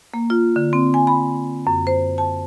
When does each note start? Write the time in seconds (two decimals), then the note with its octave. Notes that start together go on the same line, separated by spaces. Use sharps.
0.14 A#3
0.30 F4
0.56 D3
0.73 C4
0.94 G#5
1.07 B5
1.67 F#2
1.87 C5
2.18 A5